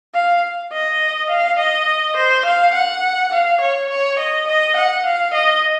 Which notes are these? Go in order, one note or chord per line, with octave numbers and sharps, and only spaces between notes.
F5
D#5
F5
D#5
C5
F5
F#5
F5
C#5
C#5
D#5
D#5
F#5
F5
D#5